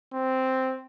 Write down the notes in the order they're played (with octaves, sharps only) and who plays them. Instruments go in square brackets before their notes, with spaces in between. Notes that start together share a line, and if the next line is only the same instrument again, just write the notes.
[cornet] C4